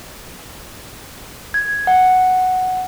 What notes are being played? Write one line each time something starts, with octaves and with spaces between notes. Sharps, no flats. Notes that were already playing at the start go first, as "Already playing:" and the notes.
G#6
F#5